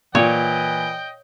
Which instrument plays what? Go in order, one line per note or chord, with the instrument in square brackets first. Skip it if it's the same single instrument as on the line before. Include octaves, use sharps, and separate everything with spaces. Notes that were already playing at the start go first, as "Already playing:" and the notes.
[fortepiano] A#2 [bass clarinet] E3 [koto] C#5 [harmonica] D#5 G5